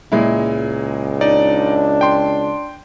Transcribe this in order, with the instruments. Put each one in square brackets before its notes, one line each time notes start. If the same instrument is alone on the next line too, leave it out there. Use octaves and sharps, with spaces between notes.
[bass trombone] C#2 [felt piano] A#2 G#3 E4
[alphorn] D4 [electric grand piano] D#4 D5
[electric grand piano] G5 C6